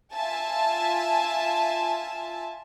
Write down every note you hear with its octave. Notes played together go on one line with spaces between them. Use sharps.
F4 E5 G#5 A5